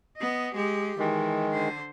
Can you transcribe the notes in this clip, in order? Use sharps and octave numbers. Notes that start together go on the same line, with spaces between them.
B3 D#5
G#3 G4
D#3 E3 G#3
D3 C5